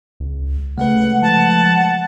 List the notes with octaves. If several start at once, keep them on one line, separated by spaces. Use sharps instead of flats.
C#2
C#3 G#3 A3 B4 F#5
F3 F#5 A5